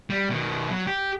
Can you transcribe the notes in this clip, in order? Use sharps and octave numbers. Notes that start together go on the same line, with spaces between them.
G3
B2 D#3
F#3
G4